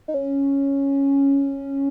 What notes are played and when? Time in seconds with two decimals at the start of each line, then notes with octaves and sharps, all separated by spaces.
0.08 D#4
0.14 C#4